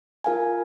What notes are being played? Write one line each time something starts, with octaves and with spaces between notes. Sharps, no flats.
F4 A#4 F5 G#5